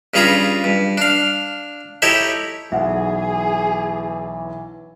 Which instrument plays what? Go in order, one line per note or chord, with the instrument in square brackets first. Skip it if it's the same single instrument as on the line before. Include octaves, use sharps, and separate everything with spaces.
[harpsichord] G2 C#3 F4 G#4 A#5 B5
G2
D4 F5
D#4 E4 G4 A4 C#5
[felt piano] B1 [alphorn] E3 [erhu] G#4 [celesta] E5 F#5